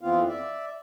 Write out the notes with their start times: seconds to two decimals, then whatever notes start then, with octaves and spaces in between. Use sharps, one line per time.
0.01 F2 E3 B3 C4 F4 F5
0.28 D5 E5